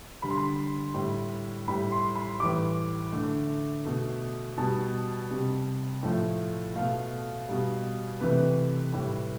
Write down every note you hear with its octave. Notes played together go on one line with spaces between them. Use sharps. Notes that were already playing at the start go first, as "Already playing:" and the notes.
D3 G3 B5
C6
B5
A2 G3
A2 G3 B5
C6
B5
A2 E3 G3 D6
D3 A3
B2 A3
B2 G3 A5
C3 G3
A2 F3 A3
B2 A3 F5
B2 G3
C3 E3 A3 B4
A2 G3